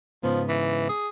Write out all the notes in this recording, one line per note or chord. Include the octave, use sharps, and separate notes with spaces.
G#2 C#3 F3 B3
E3
G#4